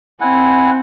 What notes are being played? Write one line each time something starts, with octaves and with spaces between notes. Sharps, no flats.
C4 E4 F#5 G#5